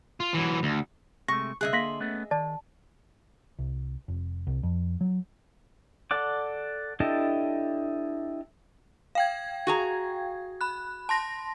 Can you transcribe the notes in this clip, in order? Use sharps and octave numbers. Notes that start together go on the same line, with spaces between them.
F4
E3 F#3
D2
C3 G#3 A3 C#6 A#6
C2 C#3 G#4 D#5 E5 F#6
D3 A#3 C6 A#6 B6 F#7
A3 B3 C#4
D#3 D5 A5
C2
F1
C2
F2
F#3
A4 D5 F#5 D6
D4 E4 G4 A4 D#5
F5 G5 G#6
F#4 G#4 A#5
B5 F#6
A5 C6 A#6